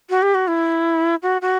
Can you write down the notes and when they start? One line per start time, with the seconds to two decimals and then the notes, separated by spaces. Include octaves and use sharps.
0.10 F#4
0.22 G4
0.34 F#4
0.48 E4
1.22 F#4
1.41 F#4